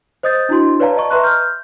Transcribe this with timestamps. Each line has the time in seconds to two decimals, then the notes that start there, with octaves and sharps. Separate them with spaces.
0.23 C5 D#5 D#6 G6 A6
0.49 D4 E4 F#4 C6
0.80 B4 C#5 D5 F5 A5 A#5
0.97 D#5 A5 C#6
1.10 B4 E5 A#5 C6 C#6 F#6
1.24 F6 G6